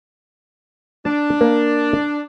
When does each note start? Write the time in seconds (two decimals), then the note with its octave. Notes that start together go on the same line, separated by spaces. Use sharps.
1.05 D4 A5
1.41 A#3